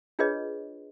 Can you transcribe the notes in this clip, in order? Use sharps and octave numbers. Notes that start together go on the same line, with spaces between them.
D4 F4 G#4 B4 C#5 D#5